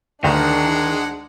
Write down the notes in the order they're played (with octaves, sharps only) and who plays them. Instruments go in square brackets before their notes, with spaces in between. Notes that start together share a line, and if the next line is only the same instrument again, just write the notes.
[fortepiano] D2 [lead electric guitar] D#3 [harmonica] G#3 F#5 [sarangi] D4